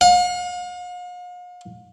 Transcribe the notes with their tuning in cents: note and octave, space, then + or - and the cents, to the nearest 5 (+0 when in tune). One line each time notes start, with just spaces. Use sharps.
F5 +45